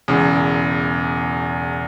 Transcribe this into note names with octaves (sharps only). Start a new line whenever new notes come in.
E1 E2 C#3